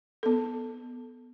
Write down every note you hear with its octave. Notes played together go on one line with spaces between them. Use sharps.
B3 A4